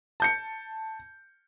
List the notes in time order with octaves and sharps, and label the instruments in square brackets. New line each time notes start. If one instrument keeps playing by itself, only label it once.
[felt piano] A5 G6 C#7